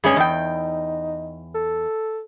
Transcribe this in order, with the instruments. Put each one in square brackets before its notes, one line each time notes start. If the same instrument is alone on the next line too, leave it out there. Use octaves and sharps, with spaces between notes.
[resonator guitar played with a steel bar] G2 G#3 C#4 [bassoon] G#4
[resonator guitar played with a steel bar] E2 G5 [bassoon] D#4
[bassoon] A4